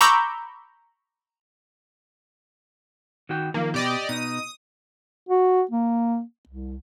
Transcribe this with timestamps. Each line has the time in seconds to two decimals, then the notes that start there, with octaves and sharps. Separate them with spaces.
0.01 A#5 B5 C#6 D6 E6 G6
3.29 D#3 F#4 G5
3.54 D#3 F3 A#3
3.74 B2 G4 D5 D#5
4.09 B2 D#4 D#6
5.29 F#4
5.72 A#3
6.49 C2